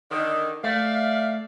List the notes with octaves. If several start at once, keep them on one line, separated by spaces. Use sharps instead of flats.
D3 D#3
A3 D5 E5 F5